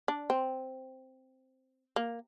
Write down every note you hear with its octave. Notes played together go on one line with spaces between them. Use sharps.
D4
C4
A#3